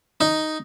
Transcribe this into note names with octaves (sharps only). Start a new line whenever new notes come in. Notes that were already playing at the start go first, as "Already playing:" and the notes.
D#4